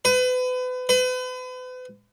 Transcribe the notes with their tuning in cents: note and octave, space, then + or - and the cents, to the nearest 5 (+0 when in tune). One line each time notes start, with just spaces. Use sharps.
B4 +35
B4 +40